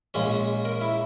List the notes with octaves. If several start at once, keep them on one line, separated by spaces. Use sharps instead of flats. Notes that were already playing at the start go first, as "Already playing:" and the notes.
A#1 A#2 G#3 C#4
A#4
E4